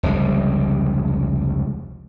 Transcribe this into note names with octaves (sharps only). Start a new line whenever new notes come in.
F1 C#2 G3 G#3